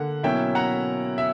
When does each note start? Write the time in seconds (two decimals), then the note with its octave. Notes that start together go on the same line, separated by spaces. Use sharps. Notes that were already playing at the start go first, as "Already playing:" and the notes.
Already playing: D3 A#3 F#5
0.23 B2 F#3 A#3 C#4 E4 E5 G5
0.55 F#5 A#5
1.18 E5